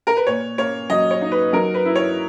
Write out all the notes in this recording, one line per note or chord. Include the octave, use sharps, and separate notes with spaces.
A#4
B4
A#2 C#5
A#3 C#5
F#3 D#5
C#5
D#4
B4
F#3 A#4
B4
E4
C#5